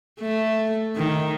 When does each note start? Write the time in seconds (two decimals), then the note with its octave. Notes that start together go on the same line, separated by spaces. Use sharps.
0.20 A3
0.96 D#3